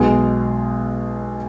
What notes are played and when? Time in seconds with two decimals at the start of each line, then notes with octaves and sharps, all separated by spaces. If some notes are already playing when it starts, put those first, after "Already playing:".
Already playing: B1 B2 G#3 B3 G#4